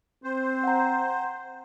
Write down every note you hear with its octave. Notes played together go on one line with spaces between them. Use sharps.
C4 C5
F#5 A#5